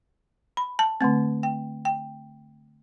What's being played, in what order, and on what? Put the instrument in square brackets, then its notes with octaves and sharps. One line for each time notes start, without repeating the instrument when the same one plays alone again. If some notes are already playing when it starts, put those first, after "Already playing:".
[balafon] B5
A5
D3 A3 C4
G5
G5